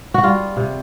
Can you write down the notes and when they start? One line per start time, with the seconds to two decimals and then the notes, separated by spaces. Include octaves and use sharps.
0.14 F#4
0.23 G3 F4
0.57 C3